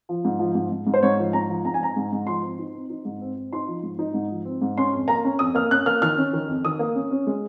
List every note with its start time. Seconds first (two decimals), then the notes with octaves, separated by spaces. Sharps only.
0.09 F3
0.25 G#2
0.39 F3
0.55 G#2
0.71 G#2
0.87 G#2
0.94 C5
1.03 G#2 C#5
1.19 F3
1.33 G#2 A#5
1.49 F3
1.65 G#2 A#5
1.74 G#5
1.80 C4 A#5
1.96 G#2
2.12 G#2
2.27 F3 C6
2.42 C4
2.59 D#4
2.75 C4
2.90 D#4
3.05 G#2
3.21 C4
3.36 C4
3.53 D#4 C6
3.67 F3
3.83 G#2
3.99 D#4
4.14 G#2
4.31 F3
4.45 C4
4.62 G#2
4.78 C#4 C6
4.93 F2
5.08 A#3 A#5
5.24 C#4
5.39 F2 D#6
5.55 A#3 F6
5.71 C#4 F#6
5.86 A#3 F6
6.02 D#3 F6
6.18 C#4
6.33 D#3
6.48 F2
6.65 D#3 D#6
6.79 A#3
6.95 C#4
7.11 C#4
7.27 G#3